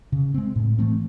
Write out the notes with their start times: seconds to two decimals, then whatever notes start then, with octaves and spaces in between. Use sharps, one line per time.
0.12 C#3
0.34 G#3 C4
0.56 A2
0.79 E3 A3 C4